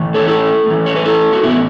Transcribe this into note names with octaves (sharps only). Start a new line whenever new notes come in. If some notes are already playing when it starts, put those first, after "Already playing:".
Already playing: A2 E3
A4 C#5
E4 A4
A2 E3
C#5
B4
E4 A4
F#4
A2 E3 B3 E4